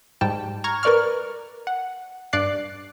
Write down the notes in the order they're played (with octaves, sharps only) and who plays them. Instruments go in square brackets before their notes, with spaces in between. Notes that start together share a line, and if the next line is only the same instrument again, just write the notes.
[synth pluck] G#2 G3 G5 A5
A#5 C#6 F6 G#6
A#4 B4 D5 C#6 F6
F#5
G2 D5 D6 F#6 C7